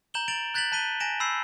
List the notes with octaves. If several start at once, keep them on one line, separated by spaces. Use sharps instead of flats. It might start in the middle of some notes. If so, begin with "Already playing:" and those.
A#5 G6 E7 F#7 G7
A6 D7 F7 F#7
F#6 G6 A6 B6 F7 F#7
A5 F#6 B6 D#7 G7
G#5 A#6 D7 E7
B5 E6 G6 C7